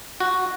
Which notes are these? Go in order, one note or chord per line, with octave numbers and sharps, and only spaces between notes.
F#4